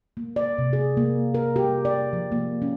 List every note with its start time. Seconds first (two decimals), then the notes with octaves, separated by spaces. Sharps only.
0.17 A#3
0.36 D5
0.58 C3
0.73 G#4
0.97 A#3
1.34 A#4
1.56 G4
1.85 D5
2.13 F3
2.32 A#3
2.62 C#4